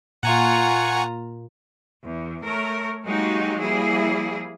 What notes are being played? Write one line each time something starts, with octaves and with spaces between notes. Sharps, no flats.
A#2 F4 F#5 G#5 A#5 C#6
E2
A3 A#4 C#5
F#3 G#3 A#3 D#4 F#4 G4
F3 G3 A#3 E4 G#4